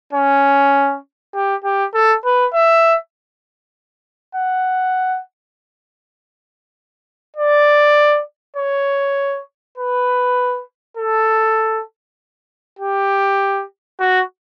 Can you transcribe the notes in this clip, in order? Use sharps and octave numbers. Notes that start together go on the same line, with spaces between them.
C#4
G4
G4
A4
B4
E5
F#5
D5
C#5
B4
A4
G4
F#4